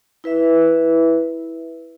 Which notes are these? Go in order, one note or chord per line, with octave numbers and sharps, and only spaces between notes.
E4 B4 E5